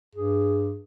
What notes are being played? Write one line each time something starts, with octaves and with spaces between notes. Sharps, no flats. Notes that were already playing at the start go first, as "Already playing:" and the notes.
G2 G#4